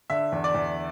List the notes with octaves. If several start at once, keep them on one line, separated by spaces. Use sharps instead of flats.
D3 E5
E2
D5
E2